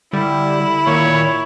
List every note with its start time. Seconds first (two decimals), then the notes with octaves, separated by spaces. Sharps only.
0.13 D3 G3 E4
0.87 A#2 D#3 C#5